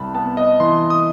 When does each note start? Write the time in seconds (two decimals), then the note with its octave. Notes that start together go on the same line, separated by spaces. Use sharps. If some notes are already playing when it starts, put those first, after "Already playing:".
Already playing: C2 A5 B5
0.15 B3 A5
0.37 D#5
0.60 E3 C6
0.90 D#6